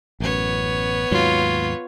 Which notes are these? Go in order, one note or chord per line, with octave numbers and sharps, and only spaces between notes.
A1 F#2 B3 C#5
D#2 G#2 F#3 F4